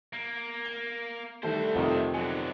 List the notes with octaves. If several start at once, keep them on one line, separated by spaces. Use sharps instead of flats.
A#3
G7
C2 D#3 G3 A3 A4 C5
F2 C3 D#3 F#5
B1 D3 F#3 G#5